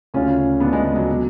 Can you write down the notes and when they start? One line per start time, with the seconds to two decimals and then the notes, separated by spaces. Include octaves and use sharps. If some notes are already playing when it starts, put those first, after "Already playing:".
0.14 D2 C#3 C#4 F4
0.60 D2 C#3 B3 D4
0.73 G#3 B3
0.84 G#3
0.96 F#3
1.11 B2 F#3